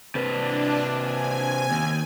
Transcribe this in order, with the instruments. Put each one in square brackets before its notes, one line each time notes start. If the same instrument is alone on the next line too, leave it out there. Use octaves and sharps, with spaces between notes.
[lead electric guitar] C3 B4 [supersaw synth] D4
[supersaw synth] G#5
[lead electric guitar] D#2